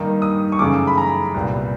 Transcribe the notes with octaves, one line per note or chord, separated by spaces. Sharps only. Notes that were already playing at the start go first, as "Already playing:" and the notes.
Already playing: G2 D#3 G3 A#3 D#4
D#6
C#6
F#2 C#3 E3 A3 D6
B5
A#5
C2 A#2 G3 B3